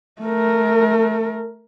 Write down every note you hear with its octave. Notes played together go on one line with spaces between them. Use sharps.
A3 A#4